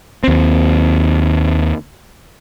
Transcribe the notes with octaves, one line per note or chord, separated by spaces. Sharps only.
D#2 C4